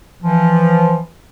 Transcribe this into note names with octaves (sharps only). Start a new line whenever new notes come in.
E3 F3